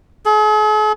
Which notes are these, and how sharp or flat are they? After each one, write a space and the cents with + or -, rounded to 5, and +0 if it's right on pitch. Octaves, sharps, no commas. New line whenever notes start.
G#4 +45